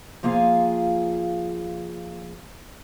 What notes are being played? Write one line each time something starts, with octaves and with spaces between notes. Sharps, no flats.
F3 A#3 F4 G#4 F5